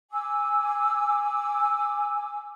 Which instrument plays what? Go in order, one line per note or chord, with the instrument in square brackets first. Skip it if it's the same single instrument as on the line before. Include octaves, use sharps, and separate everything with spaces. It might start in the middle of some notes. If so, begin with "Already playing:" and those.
[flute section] G#5 D6 E6